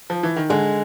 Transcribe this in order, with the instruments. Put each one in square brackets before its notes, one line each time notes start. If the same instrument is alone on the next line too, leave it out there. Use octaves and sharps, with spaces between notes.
[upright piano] F3
E3
D#3
[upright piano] D3 [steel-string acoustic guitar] G#3